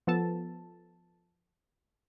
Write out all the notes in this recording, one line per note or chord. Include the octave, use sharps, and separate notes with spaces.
F3 B3 A4 A5